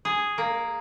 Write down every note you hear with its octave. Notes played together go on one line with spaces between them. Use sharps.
G#4
A#3